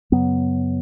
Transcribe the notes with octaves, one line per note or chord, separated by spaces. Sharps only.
F#2 C#3 F#3 B3